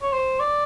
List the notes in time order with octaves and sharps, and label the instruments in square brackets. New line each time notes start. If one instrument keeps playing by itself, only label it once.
[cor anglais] C#5
C5
D5